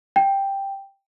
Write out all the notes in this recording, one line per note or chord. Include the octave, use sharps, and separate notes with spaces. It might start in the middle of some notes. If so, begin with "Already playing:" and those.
G5